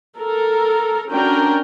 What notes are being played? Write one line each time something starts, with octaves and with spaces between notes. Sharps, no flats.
A4 A#4
C#4 D4 F#4 A#4 G5